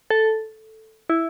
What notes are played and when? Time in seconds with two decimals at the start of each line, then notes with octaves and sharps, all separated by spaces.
0.10 A4
1.10 E4